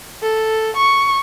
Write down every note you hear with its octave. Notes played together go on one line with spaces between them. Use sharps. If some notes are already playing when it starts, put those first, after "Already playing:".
A4
C#6